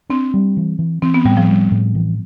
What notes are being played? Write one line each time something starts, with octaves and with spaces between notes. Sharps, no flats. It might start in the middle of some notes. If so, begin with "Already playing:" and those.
C4 D4
G3
E3
E3
E3 C4
B3
A2 G3
F3
G3
A2
E3